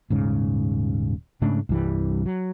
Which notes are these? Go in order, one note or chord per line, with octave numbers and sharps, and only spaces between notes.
D#1 G#2 C#3
G#2 C#3 A3 D4
C2 G2 E3 G3
F#3